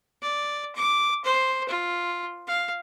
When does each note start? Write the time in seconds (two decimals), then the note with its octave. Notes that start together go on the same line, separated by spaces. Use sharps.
0.22 D5
0.75 D6
1.25 C5
1.69 F4
2.47 F5